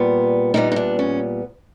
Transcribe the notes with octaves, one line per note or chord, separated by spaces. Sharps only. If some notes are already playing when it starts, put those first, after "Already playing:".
Already playing: A#2 G3 B3
A#2 G3 B3 D#4
D#4
D4
C#4